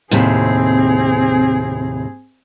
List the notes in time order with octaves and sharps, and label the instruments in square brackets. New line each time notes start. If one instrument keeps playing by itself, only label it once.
[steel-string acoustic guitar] D#2 A2 C3 [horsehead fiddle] C4 G#4